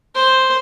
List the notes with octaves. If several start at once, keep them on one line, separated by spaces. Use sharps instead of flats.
C5